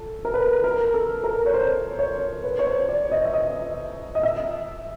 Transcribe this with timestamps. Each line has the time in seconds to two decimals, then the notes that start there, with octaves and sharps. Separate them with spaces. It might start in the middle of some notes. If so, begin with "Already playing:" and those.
Already playing: A4
0.25 A#4
0.34 B4
0.64 A#4
0.94 A4
1.24 A#4
1.46 C#5
1.54 C5
1.99 C#5
2.44 B4
2.59 C#5
2.67 C5
2.89 D5
3.11 D#5
3.25 E5
3.34 D#5
4.15 D#5
4.23 E5